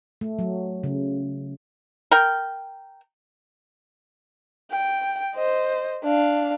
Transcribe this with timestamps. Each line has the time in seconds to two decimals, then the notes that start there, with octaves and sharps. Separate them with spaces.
0.21 A3
0.39 F#3
0.83 C#3
2.11 A#4 G5
4.71 G5
5.35 C5 D#5
6.04 D4 F5